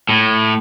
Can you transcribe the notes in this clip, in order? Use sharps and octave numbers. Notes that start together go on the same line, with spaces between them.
A2